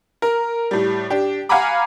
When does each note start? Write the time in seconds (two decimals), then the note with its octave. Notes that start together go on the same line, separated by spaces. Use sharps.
0.22 A#4
0.71 A2 G3
1.10 D4 G4
1.49 F5 F#5 G#5 A#5 B5 D6